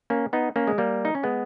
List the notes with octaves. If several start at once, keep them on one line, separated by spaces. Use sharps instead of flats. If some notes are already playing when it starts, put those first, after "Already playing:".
A#3 C#4
B3 D#4
A#3 C#4
G#3
G3 A#3
D#4
C#4
G#3 B3